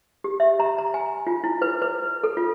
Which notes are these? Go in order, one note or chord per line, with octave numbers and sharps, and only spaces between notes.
G4
E5
A#5
A#5
G#5
F4
E4
B4
B4
A4
F4